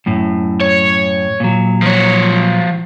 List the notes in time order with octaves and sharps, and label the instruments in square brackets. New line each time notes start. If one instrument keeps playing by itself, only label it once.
[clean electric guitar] F#2 A2
[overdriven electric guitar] C#5
[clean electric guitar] A#2 F#3
[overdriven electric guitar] F3 C#5